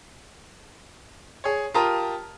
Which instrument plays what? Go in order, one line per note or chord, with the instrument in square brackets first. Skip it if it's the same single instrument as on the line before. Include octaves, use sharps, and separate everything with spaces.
[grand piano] G#4 C#5
F4 G4 A#4 A5 A#5 D#6